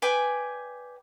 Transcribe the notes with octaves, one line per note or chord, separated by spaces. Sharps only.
B4 D5 G5 G#5